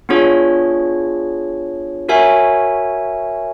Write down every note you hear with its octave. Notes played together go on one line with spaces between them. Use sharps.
B3 D4 F4 G#4 C#5
F#4 A#4 C#5 E5 G#5